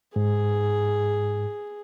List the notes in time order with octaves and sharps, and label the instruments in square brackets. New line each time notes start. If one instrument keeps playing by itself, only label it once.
[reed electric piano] G#2 [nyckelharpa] G#4